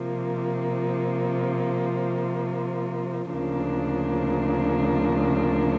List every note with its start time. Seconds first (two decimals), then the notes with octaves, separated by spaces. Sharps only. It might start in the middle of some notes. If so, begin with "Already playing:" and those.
Already playing: C3 F3 A#3
3.31 D2 C#3 F3 A#3 D4